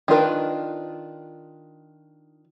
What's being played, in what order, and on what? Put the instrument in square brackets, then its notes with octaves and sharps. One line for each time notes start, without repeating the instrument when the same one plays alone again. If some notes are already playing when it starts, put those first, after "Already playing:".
[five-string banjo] D#3 D4 F4 A#4 B4